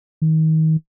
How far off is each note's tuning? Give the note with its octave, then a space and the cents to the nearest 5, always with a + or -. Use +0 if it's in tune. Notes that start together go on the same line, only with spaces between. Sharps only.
D#3 +30